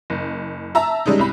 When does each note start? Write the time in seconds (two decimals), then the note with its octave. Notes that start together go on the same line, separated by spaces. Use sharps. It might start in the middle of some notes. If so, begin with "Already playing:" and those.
0.10 F#1
0.75 E5 A5 A#5 E6
1.06 G3 G#3 C#4 D#4
1.19 C2 B5